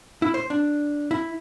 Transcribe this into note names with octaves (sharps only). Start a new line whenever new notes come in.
E4
C5
D4
E4